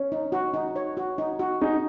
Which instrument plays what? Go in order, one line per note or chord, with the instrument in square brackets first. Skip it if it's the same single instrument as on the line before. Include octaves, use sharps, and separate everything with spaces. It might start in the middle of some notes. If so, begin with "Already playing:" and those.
Already playing: [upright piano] C#4
[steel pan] D#4
F#4
D#4
C#5
F#4
D#4
F#4
[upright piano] D#4 [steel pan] G#4